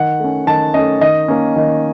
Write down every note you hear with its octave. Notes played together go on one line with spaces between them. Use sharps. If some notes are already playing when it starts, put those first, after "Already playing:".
Already playing: D#3 F#5
A3 C#4
D#3 A5
A3 C#4 D#5
D#3 D#5
A#3 C#4
D#3